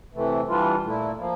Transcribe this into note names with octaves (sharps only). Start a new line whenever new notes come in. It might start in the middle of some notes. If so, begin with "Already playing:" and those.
C3 E3 A3
E3 G3 D4 F4
A#2 A3 E4
F3 A#3